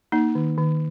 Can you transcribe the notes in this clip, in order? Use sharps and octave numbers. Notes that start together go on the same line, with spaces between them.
A#3 D#4
D#3
D#3